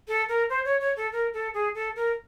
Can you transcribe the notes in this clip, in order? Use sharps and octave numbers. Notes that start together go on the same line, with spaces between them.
A4
A#4
C5
C#5
C#5
A4
A#4
A4
G#4
A4
A#4